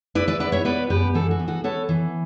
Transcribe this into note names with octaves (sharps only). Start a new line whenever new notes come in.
E4 B4 D5
B4 D5
B3 B4 D5
C#5 E5
B3 B4 D5
F#2 G4 B4
E3 F#4 A4
F#4
B3
F#4 A4
B3 A4 C#5
E3